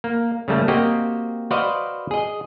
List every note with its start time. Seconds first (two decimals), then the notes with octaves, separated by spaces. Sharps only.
0.04 A#3
0.48 C#3 G3 A3 A#3
0.68 A#3 C4 F#4 G4 D#5
1.51 F#4 B4 C5 D5 D#5 F5
2.11 G#4 D#5